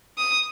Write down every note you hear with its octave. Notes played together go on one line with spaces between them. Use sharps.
D#6